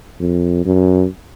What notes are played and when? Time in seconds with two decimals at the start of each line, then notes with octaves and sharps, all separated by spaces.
0.20 F2
0.65 F#2